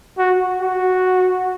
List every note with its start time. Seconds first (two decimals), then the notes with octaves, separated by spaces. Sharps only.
0.18 F#4
0.61 F#4